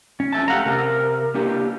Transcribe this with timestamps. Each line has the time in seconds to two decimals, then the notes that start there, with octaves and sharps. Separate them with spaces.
0.20 C#4
0.33 F2 E5 A5
0.48 A3 G4 F5 F#5 A#5
0.66 C3 A#4 A5 A#5
1.34 A#3 D4 G4